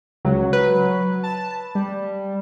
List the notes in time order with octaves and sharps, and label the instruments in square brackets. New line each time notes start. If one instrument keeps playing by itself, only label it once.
[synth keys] C#2 [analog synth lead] F#3
[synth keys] B4
[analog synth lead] A5
G3